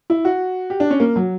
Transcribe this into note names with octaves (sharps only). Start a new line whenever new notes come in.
E4
F#4
G4
D4
C#4
A#3
F#3